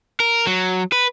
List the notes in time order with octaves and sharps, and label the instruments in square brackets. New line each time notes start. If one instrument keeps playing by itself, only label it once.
[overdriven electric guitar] A#4
F#3
B4